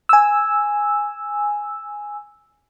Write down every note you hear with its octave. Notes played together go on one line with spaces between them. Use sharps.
G#5 E6